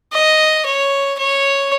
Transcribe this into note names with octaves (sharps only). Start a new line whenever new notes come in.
D#5
C#5
C#5